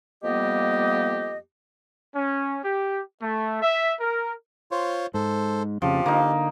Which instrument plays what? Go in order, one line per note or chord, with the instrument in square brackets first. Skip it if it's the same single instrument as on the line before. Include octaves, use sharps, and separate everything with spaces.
[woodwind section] F2 G3 A#3 B3 G4 D#5
[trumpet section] C#4
G4
A3
E5
A#4
[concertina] F4 C5 C#5
[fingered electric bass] G#2 [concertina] A4 C5
[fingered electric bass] F2 C#3 [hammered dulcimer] F3 [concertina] G4
[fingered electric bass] D3 [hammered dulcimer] A#3 D#4